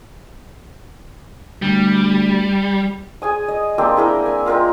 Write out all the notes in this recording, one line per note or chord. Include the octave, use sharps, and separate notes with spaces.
D2 G3
G#4 G#5 D#6
D#5
A#3 C4 D4 G4
E4 G#4 A#4 G5
G#5
F4 A#4 D#5 G5